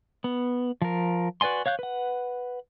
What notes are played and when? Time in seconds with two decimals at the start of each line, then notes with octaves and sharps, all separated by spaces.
0.24 B3
0.82 F3 A#4
1.41 F#4 B4 D5 G#5 C6
1.66 C#5 F5 F#6 G6
1.79 B4 F#5